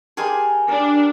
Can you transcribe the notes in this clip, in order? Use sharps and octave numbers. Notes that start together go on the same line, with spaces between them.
G4 G#4 A#4 G#5 A5 C6
D4 A#4